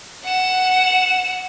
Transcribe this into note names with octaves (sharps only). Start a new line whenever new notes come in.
F#5 E7